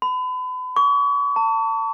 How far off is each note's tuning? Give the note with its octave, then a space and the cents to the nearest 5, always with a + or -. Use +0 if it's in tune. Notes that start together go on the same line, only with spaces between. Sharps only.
B5 +35
C#6 +40
A5 +30